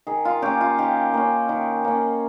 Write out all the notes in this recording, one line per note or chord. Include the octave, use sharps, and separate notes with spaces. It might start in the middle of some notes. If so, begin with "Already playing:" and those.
D#3 G#4
F4
A#3 C#4 G4
F4
D#3 G4
A#3 C#4
D#3
A#3 C#4